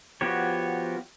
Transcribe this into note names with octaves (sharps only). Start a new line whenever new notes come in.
F3 B3 F#4 G4 C#5